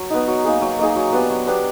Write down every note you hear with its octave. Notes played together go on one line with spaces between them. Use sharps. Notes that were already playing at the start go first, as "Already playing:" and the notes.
Already playing: F#3
B3 D#4
F#3
A#3 D#4 G#4
F#3
A#3 D#4 G#4
F#3
B3 D4 G4
F#3
B3 D4 G4